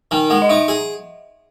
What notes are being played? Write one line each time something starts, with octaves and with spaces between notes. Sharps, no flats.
D#3 G#5
G#3 F#5
D#5
D#4 E5
G#4